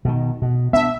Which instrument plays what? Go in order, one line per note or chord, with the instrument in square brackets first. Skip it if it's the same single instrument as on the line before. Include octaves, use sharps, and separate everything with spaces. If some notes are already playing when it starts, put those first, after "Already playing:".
[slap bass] B2 D#3
B2
[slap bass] B3 D4 [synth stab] E5